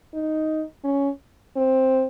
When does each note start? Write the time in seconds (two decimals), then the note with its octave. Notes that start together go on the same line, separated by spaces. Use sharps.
0.14 D#4
0.84 C#4
1.56 C4